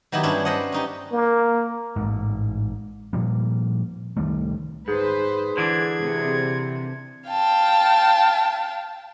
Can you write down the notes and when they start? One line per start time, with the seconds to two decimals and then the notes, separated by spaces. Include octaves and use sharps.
0.12 D#3 F#3 B3 D#4 E4 G4
0.23 G2 C#4 D4 E4
0.45 B4 C5 D5 D#5 F#5
0.72 C#4 D#4 G4
1.12 A#3
1.96 A1 G#2
3.13 A#2 F3 G3 A#3
4.17 C2 D#3 G3 A3
4.88 G#2 G#4 B4 C5
5.57 D3 E3 D4 G#6
6.01 C3
7.28 F5 G5 A5